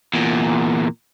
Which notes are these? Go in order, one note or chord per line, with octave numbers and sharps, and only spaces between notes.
E2 A#2